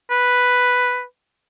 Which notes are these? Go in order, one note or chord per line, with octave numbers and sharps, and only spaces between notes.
B4